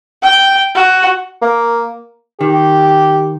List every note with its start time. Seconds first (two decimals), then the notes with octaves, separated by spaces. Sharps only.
0.23 G5
0.75 F#4
1.42 A#3
2.41 D#3 G4